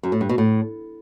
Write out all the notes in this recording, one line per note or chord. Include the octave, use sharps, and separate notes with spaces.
F#2
A2
G2
B2
A2